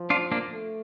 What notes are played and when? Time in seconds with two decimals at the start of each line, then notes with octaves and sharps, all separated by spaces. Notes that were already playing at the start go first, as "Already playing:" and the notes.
Already playing: F3
0.10 D4 F4
0.32 A#3 D4
0.52 A3